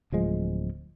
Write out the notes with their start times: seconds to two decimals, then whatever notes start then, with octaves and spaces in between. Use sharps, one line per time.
0.12 D1 F3 G#3